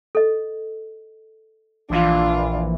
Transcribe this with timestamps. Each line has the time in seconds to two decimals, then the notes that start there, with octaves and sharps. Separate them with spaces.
0.15 A4 D#5
1.90 A#1 E3 D4 F4